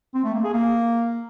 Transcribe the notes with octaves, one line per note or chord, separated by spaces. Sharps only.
C4
A3
A#3
G#4
A#3